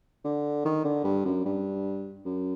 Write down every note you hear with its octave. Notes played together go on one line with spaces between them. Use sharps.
D3
D#3
D3
G2
F#2
G2
F#2